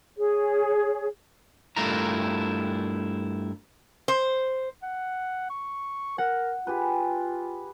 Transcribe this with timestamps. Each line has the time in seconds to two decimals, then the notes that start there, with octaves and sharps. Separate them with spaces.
0.17 G#4 C#5
1.76 G2 A3 E4 F4 A#4 A#5
4.08 C5
4.83 F#5
5.50 C#6
6.18 A#4 F#5
6.67 F4 G4 G#4 B4